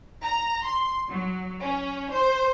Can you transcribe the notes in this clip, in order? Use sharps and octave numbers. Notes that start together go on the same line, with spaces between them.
A#5
C6
F#3
C#4
C5